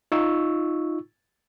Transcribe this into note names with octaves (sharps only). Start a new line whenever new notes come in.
D#4 F4 C#6 E6